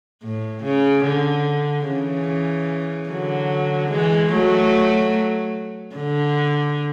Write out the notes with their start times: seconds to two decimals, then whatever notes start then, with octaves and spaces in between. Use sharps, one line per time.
0.24 A2
0.64 C#3
1.05 D3
1.87 C#3 E3
3.10 D3 F#3
3.91 E3 G#3
4.32 F#3 A3
5.96 D3